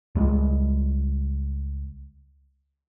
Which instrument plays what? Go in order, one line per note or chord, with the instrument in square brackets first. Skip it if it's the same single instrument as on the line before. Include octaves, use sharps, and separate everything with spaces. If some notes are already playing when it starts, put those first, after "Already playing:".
[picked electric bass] C#2 G3 G#3